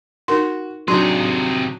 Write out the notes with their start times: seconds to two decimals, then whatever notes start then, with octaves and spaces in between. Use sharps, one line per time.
0.28 D#4 F#4 A#4 C6
0.88 C3 F#3 D4 D#4 G#4 C6